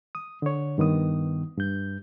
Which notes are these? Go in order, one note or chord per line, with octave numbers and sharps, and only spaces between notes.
D#6
D3 C#5
G2 D#3 B3 D#6
G2 G6